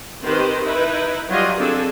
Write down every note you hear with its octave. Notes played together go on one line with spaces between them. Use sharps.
D#3 C4 G4 B4 C5 D#5
D#4 E4 B4
F#3 G3 F4 G4 D#5
C4 D4 G#4 A4